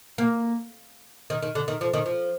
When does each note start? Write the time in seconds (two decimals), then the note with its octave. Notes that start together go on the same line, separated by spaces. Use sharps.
0.18 A#3
1.30 D#3
1.43 D#3
1.55 D3
1.68 D#3
1.81 F3
1.94 D#3
2.06 F3